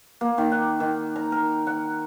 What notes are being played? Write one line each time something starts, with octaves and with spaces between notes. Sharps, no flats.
A#3
D#3
F#5
D#3
A#5
A#4
F#5